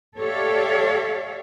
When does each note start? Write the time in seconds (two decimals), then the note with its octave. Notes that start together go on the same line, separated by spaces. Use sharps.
0.19 G4 A4 C#5 D5 E5 F5